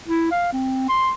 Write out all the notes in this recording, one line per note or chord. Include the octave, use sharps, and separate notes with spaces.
E4
F5
C4
C6